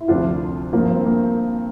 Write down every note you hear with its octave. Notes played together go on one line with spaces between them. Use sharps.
E4
D2 C3 F3 D4 F4
G2 F3 A#3
C4
A#3